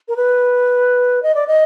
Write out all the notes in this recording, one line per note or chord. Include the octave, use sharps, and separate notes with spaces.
A#4
B4
D#5
D5
D#5